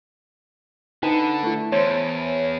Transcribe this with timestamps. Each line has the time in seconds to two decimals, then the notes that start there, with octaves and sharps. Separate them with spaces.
1.03 D3 D#4 B4 A5 B5
1.43 A3 E4
1.72 E2 C5 C#5